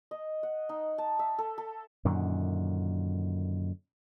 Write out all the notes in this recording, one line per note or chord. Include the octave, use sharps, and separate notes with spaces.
D#5
F#5
D#4
A5
E5
A4
A4
F#2 A#2 D3 D#3